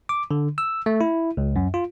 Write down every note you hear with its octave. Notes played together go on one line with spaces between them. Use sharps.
D6
D3
E6
A3
E4
C#2
F#2
F4